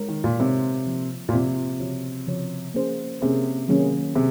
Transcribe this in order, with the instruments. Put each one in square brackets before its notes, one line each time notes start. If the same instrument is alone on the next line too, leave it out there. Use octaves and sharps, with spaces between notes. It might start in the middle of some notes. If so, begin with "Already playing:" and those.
Already playing: [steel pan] G#3 D#4 A#4 C#5
[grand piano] D#3
A#2
[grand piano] C3 [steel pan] G#3 D#4 A#4 C#5
[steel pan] F3 A#3 F4
[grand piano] A#2
[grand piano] C3 [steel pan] F3 A#3 F4
[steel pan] C#3 F3 C4 F#4 C#5
C#3 F3 C4 F#4 C#5
A#3 C#4 G#4 C5
[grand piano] C3 [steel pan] A#3 C#4 G#4 C5
[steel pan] D#3 F#3 A#3 C#4 G#4
[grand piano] C3 [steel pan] G#4